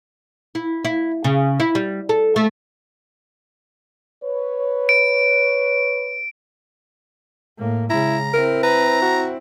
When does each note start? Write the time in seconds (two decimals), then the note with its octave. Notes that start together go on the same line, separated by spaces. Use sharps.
0.55 E4
0.85 E4
1.24 C#3
1.60 E4
1.75 G3
2.09 A4
2.36 A3
4.24 B4 C#5
4.89 D7
7.58 A2 A#3
7.90 C#3 G#3 E4 A#5
8.34 C4 E4 A#4
8.63 B4 A#5
9.02 F#4